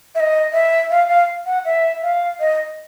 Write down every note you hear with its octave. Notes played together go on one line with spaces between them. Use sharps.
E5
D#5
E5
F5
F5
F#5
E5
F5
D#5